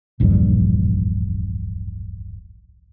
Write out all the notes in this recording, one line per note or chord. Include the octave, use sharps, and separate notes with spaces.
D1 A#1 E2 G2